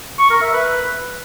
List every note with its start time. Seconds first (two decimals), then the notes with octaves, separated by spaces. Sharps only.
0.19 C#6
0.30 A#4
0.41 E5
0.53 B4